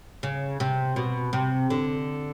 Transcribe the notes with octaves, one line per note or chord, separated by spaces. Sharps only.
C#3
C3
B2
C3
D3